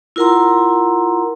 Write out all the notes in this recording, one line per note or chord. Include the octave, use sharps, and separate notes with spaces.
E4 F4 A#4 F#5 A#5 C6